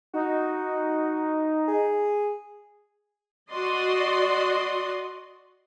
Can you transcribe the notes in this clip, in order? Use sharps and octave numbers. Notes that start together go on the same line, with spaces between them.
D#4 F#4
G#4
F#4 D5 D#5 C6